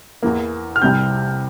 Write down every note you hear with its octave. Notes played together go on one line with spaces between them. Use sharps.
E2 E3 A#3
F6
C2 C3 G3 C4 G6